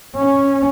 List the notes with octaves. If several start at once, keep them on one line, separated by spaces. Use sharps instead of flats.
C#4